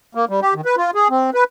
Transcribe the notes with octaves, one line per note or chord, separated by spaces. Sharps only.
A#3
G3
G4
D#3
B4
F4
G#4
C4
B4